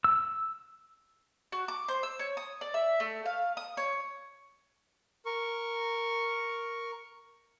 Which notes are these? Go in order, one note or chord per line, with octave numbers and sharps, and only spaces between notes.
E6
F#4
D6
C5
E6
C#5
D#6
D5
E5
A3
F5
D#6
C#5
A#4 C#6